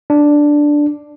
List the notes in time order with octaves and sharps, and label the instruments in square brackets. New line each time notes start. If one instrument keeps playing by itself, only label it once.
[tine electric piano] D4